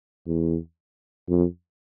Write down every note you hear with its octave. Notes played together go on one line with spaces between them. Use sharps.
E2
F2